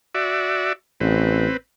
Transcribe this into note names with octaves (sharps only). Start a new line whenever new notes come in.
F#4 D5 E5
A1 C4 B4